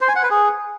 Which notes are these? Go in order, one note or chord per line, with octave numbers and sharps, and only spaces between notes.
C5
G#5
F#5
B4
G#4